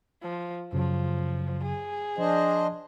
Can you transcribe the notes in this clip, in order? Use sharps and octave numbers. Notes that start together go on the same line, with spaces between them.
F3
F#2 C#3 F3 F#3
G#4
F3 D4 C5 D#5